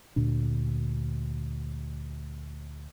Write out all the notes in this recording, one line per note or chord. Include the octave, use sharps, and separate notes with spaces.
D2 A#2 D4